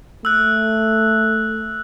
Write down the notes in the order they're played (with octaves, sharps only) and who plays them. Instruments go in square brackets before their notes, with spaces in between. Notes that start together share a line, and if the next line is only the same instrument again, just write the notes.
[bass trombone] A3 [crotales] E6 F#6